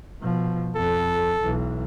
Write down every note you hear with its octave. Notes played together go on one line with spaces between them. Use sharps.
B2 F3
F2 A4
B1 E3